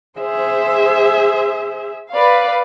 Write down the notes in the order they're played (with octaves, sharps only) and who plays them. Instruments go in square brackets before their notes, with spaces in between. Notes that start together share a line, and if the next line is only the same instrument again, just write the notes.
[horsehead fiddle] G#4 E5 [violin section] C5
[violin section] B4 D5 F5